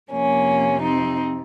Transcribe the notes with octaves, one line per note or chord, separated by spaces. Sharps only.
F2 C3 F3 A#3 C#4
C4 D#4